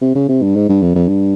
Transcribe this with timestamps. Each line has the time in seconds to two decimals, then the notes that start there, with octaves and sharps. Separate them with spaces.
0.02 C3
0.15 C#3
0.29 C3
0.42 G2
0.56 G#2
0.69 G2
0.82 F2
0.95 F2
1.08 G2